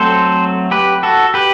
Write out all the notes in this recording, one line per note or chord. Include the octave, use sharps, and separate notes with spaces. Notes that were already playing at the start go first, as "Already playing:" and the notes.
Already playing: F#3 A3 C4 A4 C5
G4 B4
F#4 A4
G4 B4